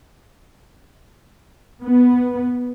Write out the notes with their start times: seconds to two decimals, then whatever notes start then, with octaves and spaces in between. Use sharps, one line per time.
1.84 B3